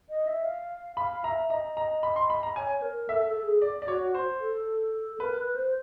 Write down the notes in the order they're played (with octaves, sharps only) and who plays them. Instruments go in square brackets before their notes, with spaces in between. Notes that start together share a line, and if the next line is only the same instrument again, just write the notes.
[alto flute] D#5
E5
F5
[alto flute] F5 [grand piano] B5
[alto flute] E5 [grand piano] A#5
[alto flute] D#5 [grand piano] A#5
[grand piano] A#5
B5
C6
B5
A#5
[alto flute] C#5 [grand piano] G#5
[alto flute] A#4
[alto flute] A4 [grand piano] E5
[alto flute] A4
G#4
[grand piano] D5
D5
[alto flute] F#4 [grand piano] C#5
[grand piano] C5
[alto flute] A4
[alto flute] A#4 [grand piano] B4
[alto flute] B4
C5